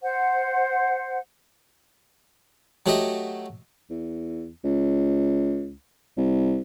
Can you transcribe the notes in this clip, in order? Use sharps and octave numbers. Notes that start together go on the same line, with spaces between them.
C5 F#5
F#3 A3 F#4 G4 D#5 E5
E2
C#2
C2